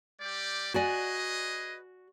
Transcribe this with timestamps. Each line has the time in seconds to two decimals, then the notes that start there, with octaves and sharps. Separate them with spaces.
0.21 G3 G4 D5
0.74 F#4 G#4 B4 D5 D#5 G#5